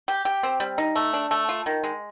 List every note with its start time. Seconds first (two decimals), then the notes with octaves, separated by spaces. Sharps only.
0.08 G4
0.25 G4
0.43 C4
0.60 G3
0.78 D#4
0.95 A3
1.13 D4
1.31 A3
1.49 F4
1.66 D#3
1.84 G#3